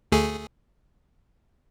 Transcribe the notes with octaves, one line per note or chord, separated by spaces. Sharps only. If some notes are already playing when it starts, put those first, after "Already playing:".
D2 A3 G#4